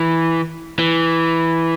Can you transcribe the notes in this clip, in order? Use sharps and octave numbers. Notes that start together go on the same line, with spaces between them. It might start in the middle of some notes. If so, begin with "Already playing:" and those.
Already playing: E3
E3